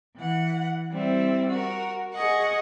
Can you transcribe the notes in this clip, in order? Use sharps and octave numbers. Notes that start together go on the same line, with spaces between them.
E3 F#5
G3 C4 E4
F#4 A#4
G#4 D#5 F#5 C#6